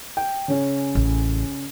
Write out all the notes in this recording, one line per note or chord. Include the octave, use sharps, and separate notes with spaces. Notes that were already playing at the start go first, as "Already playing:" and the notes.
G5
C#3 C#4
A1